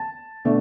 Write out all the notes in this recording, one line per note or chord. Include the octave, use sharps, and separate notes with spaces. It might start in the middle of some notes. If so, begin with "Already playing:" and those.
Already playing: A5
B2 A3 D4